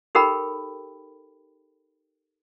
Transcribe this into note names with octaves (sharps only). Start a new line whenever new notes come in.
D#4 G4 A4 A#4 G5 B5